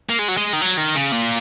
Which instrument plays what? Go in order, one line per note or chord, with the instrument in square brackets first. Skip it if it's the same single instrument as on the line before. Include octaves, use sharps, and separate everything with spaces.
[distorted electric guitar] A#3
G#3
F#3
G#3
D#3
F#3
D#3
C#3
A#2